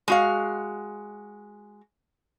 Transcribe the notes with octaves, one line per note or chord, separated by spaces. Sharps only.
G#3 F#4 F5